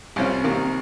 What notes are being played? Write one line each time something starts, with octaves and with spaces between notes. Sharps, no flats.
C2 C3 G3 C#4 F4
C2 C3 D#3 A#3